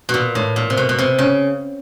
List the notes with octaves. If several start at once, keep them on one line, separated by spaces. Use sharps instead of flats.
B2
A#2
A2
A#2
C3
B2
B2
C3
C#3